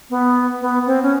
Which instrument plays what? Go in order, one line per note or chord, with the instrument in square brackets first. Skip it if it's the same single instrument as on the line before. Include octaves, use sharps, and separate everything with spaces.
[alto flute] B3
B3
C4
C#4